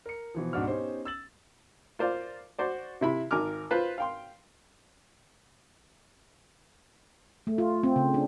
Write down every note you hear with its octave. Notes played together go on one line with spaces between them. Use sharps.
A#4 C#7
B2 E3 F3
G#2 B2 C4 D4 F#4 F6
B3 C#4 D#4 G4 C5
E6 A6 F#7
F4 A#4 C5 D5 F5
F#4 C5 D5
C3 E4 B5
G#1 A#4 G#5 D6 F6
F4 B4 C5
F5 G5 C6
A3
F4
C4
C#3
D4